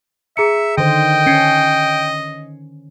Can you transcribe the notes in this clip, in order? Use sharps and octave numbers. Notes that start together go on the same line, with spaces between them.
G#4 E5 A#5 C#7
D3 D#3 C5 D#5 G5 C6
C#4 G#6 C7 C#7